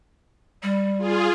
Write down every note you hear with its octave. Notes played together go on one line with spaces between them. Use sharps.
G3
F4 G#4